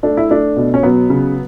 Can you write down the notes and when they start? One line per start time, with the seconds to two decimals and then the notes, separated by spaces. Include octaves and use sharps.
0.03 A3 D4
0.17 E4
0.30 A3 D4
0.57 B2
0.74 C#4
0.83 F#3 B3
1.10 C#3